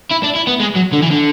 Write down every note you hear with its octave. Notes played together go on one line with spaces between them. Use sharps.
E4
D4
E4
B3
G#3
F#3
D3
E3
D3